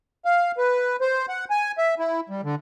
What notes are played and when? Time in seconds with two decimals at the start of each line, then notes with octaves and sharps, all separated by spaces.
0.25 F5
0.57 B4
1.01 C5
1.29 F#5
1.50 G#5
1.78 E5
1.99 E4
2.29 G3
2.44 D3